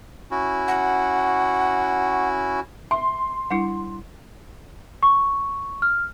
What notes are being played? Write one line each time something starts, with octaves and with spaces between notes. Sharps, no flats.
C#4 E4 F#4
F#5
E5 C6
G3 D4 E4
C#6
F6